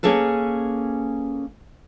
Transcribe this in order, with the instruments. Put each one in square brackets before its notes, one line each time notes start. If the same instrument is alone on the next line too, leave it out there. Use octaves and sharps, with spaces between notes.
[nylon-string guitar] A#3 C#4 G#4 A4 B4